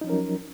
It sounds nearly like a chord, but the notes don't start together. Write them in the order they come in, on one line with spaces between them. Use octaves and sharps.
D#4 F3 C#4 A#4 F#3